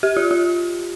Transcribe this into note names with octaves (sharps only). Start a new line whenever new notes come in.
G4
F4
F4